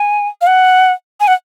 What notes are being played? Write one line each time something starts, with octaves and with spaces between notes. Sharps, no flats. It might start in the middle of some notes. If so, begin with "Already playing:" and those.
Already playing: G#5
F5
F#5
G#5
F#5